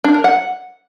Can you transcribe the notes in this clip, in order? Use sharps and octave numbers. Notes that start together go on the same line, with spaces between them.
D4
A#4
F#5